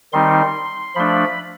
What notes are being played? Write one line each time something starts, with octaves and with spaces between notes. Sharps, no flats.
D#3 G3 C4 D#4 C6
F3 A3 D4 B5